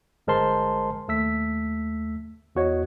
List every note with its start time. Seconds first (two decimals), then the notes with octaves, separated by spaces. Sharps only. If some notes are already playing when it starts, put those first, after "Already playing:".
0.27 G1 G#3 A#4 C5 A5 C6
1.08 D#2 A3 E6 B6
2.55 E2 F#4 C#5 D#5